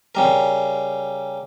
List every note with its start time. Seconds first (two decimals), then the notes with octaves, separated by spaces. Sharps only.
0.15 C#3 G3 A#4